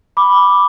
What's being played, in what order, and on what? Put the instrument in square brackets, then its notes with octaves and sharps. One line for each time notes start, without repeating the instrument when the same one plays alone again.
[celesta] B5 D6